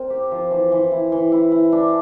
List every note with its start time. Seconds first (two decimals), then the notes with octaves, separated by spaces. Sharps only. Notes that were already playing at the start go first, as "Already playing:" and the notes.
Already playing: C4 A#4
0.10 G4
0.31 F3
0.51 E3
0.72 E3
0.92 E4
1.12 E3
1.32 E4
1.52 E4
1.72 D4